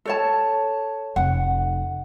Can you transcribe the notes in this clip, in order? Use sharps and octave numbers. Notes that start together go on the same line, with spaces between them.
A4 C#5 A5
F1 F#5